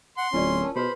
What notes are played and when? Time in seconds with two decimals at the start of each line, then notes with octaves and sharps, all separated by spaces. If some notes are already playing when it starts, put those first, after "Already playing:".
0.18 F#5 C6
0.33 D1 C#4 E4 F4 D5
0.62 A#4 A5
0.76 B2 G4 G#4 B4 C5 B5